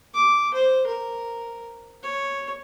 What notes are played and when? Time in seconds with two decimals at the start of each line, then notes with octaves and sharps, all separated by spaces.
0.14 D6
0.54 C5
0.87 A#4
2.03 C#5